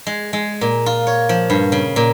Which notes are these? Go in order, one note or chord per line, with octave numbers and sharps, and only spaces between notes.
G#3
G#3
A#2
F4
C#5
F3
G2
C#3
A#2